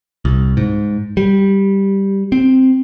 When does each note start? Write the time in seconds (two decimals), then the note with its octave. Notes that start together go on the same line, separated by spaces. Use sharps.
0.25 C2
0.57 G#2
1.17 G3
2.32 C4